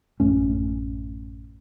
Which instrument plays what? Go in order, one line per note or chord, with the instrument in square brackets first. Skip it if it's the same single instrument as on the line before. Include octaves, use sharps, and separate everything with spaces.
[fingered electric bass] A1 F#2 A3 C#4